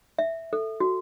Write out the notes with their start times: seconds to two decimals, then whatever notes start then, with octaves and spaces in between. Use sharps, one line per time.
0.19 E5
0.53 A4
0.80 F#4